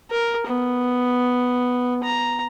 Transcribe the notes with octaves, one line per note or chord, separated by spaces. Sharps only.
A#4
B3
A#5